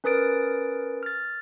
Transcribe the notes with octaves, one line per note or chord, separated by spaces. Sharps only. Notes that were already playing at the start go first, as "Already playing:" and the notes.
C#4 A#4 B4 D#6 A6 D7
F6 A6